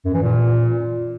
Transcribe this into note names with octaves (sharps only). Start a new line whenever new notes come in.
F#2
E3
A#2